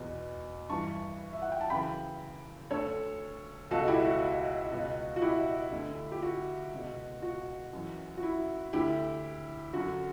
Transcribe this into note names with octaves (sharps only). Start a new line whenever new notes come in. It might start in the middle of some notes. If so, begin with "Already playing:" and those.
Already playing: E2 B2
G2 E3 A5 C#6
E5
F#5
G5
A5
F#2 C#3 E3 G5 B5
D2 D3 A4 C#5
C#2 B2 F#4 A4
E4 G4
F#4
C#2 B2
F#4
E4 G4
D2 D3
G4
F#4
C#2 B2
F#4
F#2 E3
F#4
E4
D2 D3 E4 G4
F#2 D3 F#4